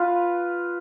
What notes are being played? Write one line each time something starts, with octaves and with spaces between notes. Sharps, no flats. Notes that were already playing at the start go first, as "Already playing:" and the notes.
Already playing: F4 B4